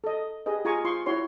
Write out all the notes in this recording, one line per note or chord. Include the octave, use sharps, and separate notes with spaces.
A4 D#5
G4 G#4 B4 D#5
F4 G#4 G#5 A#5 C#6
F4 C6 C#6
E4 F#4 C#5 C6